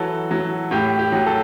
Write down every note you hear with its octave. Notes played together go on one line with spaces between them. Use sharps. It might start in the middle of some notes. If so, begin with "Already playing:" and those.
Already playing: E3 F#3 A4
F#3
A2 G4
G4
F#3
A4